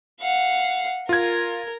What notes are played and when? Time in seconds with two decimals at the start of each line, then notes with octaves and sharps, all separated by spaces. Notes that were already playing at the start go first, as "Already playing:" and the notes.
0.21 F5 F#5
1.09 F4 A#4 G#6